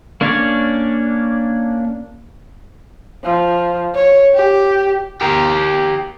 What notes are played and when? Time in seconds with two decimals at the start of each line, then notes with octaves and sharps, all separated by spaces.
0.21 A#3 C#4 D4 C#5 D5
3.23 F3
3.94 C#5
4.34 G4
5.21 G4 A#4